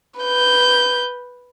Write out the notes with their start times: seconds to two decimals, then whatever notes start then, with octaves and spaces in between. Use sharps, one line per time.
0.20 B4 G6